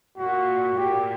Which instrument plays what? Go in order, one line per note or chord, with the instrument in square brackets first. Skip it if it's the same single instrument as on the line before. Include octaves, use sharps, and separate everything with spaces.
[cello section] A#2 [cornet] F#4
[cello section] A#2 [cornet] G4